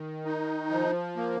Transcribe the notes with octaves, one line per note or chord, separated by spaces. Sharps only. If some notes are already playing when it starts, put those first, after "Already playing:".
Already playing: D#3
D#4
F3
A#3